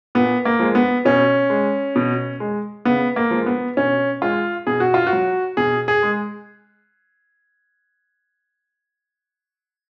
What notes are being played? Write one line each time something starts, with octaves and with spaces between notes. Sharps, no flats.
A#2 B3
A#3
F3 G#3
B3
B2 C#4
G#3
B2
G#3
C#3 B3
A#3
F3 G#3
B3
B2 C#4
G#3 F4
B2 G#4
F#4
F4
F#4
F#3
B2 G#4
G#4
G#3